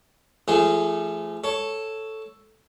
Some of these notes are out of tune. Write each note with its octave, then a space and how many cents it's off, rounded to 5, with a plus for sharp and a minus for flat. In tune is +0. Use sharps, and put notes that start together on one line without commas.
F3 -40 A3 +0 G#4 -5
A4 +0 C#5 +0